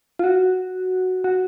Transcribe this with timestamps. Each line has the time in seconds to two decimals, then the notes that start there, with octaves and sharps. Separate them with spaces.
0.19 F4
0.24 F#4
1.24 F#4